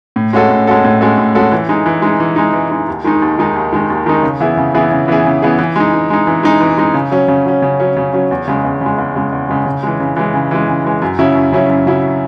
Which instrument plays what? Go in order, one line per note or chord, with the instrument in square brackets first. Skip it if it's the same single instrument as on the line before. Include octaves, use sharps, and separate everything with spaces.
[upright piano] A2
G#3 C#4 F#4 A4
A2
G#3 C#4 F#4 A4
A2
G#3 C#4 F#4 A4
A2
G#3 C#4 F#4 A4
E3
G#3 D#4
E3
G#3 D#4
E3
G#3 D#4
E3
G#3 D#4
D#2
D#3 G#3 D#4
D#2
D#3 G#3 D#4
D#2
D#3 G#3 D#4
D#2
D#3 G#3 D#4
C#3
E3 B3 E4 G#4
C#3
E3 B3 E4 G#4
C#3
E3 B3 E4 G#4
C#3
E3 B3 E4 G#4
E3
G#3 D#4
E3
G#3 D#4
E3
G#3 D#4
E3
G#3 D#4
C#3
F#3 C#4
C#3
F#3 C#4
C#3
F#3 C#4
C#3
F#3 C#4
E2
C#3 G#3
E2
C#3 G#3
E2
C#3 G#3
E2
C#3 G#3
C#3
E3 G#3
C#3
E3 G#3
C#3
E3 G#3
C#3
E3 G#3
F#2
C#3 F#3 C#4 E4
F#2
C#3 F#3 C#4 E4
F#2
C#3 F#3 C#4 E4